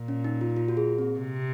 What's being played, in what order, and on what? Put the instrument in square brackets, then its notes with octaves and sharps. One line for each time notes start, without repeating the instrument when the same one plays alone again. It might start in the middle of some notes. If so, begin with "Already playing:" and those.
Already playing: [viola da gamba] A#2
[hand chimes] C#4
D#4
F4
F4
F#4
G#4
C4
[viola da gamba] C3